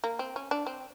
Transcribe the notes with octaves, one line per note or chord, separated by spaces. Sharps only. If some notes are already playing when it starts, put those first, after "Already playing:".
A#3
C4
C#4
D4
C4